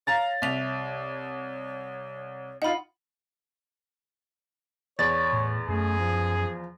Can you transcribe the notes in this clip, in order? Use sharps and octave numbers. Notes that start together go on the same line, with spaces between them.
C#5 F5 A#5 A6
C2 E5 F7
D#4 F4 F#5 B5
E2 C#5 D5 A6
A2
F#2 A3 G#4
F3
F3